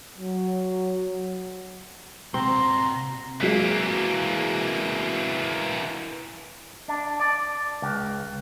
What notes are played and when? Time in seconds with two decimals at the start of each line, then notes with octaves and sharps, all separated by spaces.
0.18 F#3
2.34 C3 C4 F#4 A#5 C6
3.41 E3 F#3 G#3 A#3 B6
6.88 D4
7.20 D5
7.82 C#2